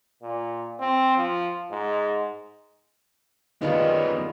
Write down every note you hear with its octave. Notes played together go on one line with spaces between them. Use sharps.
A#2
C4
F3
G#2
F#2 D#3 G3 G#3 B3 D#4 F4